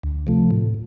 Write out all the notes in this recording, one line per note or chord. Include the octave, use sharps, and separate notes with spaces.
D2
C3 F3 A3
A2